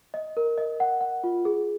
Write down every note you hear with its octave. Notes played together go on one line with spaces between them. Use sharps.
D#5
A#4
D#5
F#5
F#5
F4
G#4